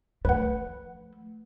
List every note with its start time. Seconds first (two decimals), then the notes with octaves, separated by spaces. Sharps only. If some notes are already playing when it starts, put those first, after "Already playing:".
0.25 F3 A3 B4 F#5